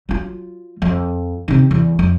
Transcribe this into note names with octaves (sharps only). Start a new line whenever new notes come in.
F#3 F4
F2
C3 D#3
E2
F2